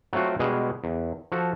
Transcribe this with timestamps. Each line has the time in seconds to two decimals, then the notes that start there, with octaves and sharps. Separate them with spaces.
0.13 F#3 A3 C4 F4 F#4
0.39 B2 G3 G#3 G#4
0.84 E2
1.32 F3 F#4 A4